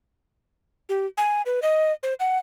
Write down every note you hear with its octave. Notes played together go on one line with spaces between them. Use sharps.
G4
G#5
B4
D#5
C5
F#5